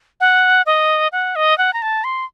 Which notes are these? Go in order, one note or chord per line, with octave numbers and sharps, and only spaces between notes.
F#5
D#5
F#5
D#5
F#5
A#5
A5
C6